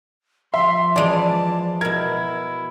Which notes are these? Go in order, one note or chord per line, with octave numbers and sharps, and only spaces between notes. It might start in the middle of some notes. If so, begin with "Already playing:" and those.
F3 E5 C6
E3 G#3 D5 A5 D7 F7
B2 E4 A#4 G#6